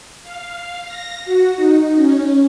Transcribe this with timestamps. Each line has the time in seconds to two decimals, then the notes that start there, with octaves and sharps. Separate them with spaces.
0.23 F5
0.85 A#6
1.25 F#4
1.56 D#4
1.96 C#4